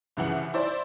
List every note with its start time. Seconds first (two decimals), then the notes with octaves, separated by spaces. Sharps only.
0.17 C2 C#3 E3 F#5 F#7
0.54 E4 C5 D5